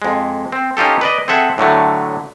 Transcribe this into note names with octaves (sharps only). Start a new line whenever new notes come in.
F2 G#3
C4
C#4 D#4 F4 G4 A4
B4 D5 D#5
C4 G#4 A4 E5 F#5
A2 D3 F#3 A3